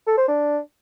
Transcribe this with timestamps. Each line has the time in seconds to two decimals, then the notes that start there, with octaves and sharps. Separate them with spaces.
0.07 A4
0.18 C5
0.28 D4